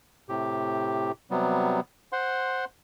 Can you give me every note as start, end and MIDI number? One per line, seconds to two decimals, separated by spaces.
0.29 1.12 45
0.29 1.12 48
0.29 1.12 67
1.31 1.80 48
1.31 1.80 54
1.31 1.80 55
1.31 1.80 59
2.12 2.65 72
2.12 2.65 78
2.12 2.65 84